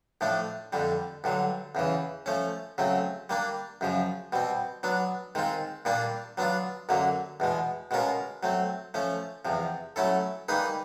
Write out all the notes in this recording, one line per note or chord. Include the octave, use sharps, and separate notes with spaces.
A2 F3 A3 D4
F2 D3 G3
G2 D3 F#3
E2 C#3 E3
F3 A3 C#4
C#3 F#3 A3 C4
G3 A#3 D4
F#2 C#3 F3
B2 G3 C4
F#3 B3 D4
D#3 G#3 C4 F4
A#2 G3 A#3 D4 F4
F#3 B3 D4 F4
F#2 D3 F#3 A#3
E2 B2 G#3
B2 G#3 C#4 F4 A#4
F#3 A3 C4
F3 A3 C#4
E2 C3 F3
F#3 A3 C#4 E4 A4
G3 A#3 D#4 G#4 B4